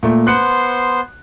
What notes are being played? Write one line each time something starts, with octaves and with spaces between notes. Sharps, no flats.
A#2 A3
B3 C5 C6 F#6 C#7